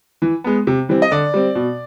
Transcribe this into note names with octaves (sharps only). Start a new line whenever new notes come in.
E3
G#3 B3
C3
E3 G3 C4
D#5
D3 D5
G3 C4
B2